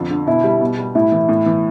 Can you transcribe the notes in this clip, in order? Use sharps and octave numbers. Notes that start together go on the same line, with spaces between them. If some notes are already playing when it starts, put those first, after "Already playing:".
Already playing: F2 D3
D3
B2 E4
G3
B2
G3
A2 E4
E3
A2
E3